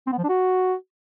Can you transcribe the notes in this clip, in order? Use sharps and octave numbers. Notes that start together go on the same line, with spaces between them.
C4
B3
F3
D4
F#4